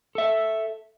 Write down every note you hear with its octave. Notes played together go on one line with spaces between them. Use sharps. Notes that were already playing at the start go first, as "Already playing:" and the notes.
A4 E5